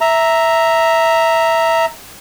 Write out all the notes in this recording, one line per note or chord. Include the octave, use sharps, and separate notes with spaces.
E5 A#5